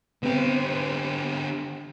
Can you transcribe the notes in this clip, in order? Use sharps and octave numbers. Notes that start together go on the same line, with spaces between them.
D3 B3 C4 G4